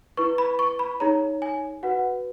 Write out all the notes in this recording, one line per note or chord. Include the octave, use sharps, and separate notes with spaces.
E4 B4 C#6
B5
C#6
B5
D#4 G#4 C#5 A#5
G#5
F#4 B4 F#5